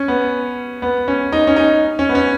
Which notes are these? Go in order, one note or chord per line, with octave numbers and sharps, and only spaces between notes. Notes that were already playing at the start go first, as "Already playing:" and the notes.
Already playing: C#4
B3
B3
C#4
D#4
C#4
D#4
C#4
B3
C#4